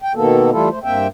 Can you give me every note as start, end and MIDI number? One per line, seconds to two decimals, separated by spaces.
0.02 0.13 79
0.15 0.51 47
0.15 0.51 51
0.15 0.51 58
0.15 0.51 59
0.15 0.51 69
0.51 0.69 52
0.51 0.69 55
0.51 0.69 57
0.51 0.69 64
0.51 0.69 65
0.51 0.69 69
0.70 0.79 57
0.70 0.79 72
0.84 1.08 43
0.84 1.08 58
0.84 1.08 60
0.84 1.08 76
0.84 1.08 79